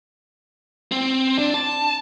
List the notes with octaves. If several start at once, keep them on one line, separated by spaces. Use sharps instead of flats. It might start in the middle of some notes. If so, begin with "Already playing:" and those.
C4
D4
A5